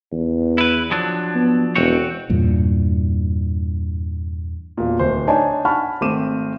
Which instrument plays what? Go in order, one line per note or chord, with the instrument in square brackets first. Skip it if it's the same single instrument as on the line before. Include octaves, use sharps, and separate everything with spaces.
[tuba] E2
[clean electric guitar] E4 B4
F3 F#3 D4
[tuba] B3
[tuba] E1 [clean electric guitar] C4 F#4 C#5
[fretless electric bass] E2 G2 A#2
[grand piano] E1 A#2
D1 C5
D4 D#4 C#5 G#5 A5
F#5 G#5 A5 B5 C#6 F6
G#1 A3 C4 D6 D#7 E7